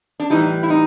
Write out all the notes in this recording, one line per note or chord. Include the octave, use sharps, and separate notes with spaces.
D4
A2 E3 G3 D#4
E4
D#4